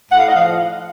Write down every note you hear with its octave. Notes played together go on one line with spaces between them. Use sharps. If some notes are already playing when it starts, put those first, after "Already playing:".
A2 F#5
F5
D#5
F3 F5